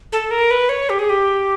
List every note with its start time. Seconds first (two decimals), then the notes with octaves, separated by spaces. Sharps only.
0.12 A4
0.31 A#4
0.51 B4
0.69 C#5
0.90 G4
0.99 G#4
1.10 G4